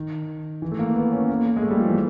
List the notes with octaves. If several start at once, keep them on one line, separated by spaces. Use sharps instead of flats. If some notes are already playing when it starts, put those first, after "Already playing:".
Already playing: D#3
E3
A3
A#3
B3
C#4
A#3
A#3
G#3
A3
G3
F3
E3